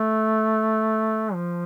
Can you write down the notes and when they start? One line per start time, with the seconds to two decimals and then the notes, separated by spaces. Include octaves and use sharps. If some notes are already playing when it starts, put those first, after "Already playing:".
Already playing: A3
1.33 F3